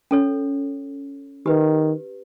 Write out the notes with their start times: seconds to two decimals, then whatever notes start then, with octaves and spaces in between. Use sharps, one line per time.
0.11 C#4 A4 C#5
1.46 D#3 G4 B4